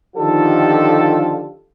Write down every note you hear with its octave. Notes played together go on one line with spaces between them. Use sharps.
D3 D#3 F3 F4 G4 A4